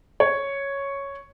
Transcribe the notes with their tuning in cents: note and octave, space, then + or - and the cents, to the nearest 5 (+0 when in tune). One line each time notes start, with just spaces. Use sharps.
C#5 +0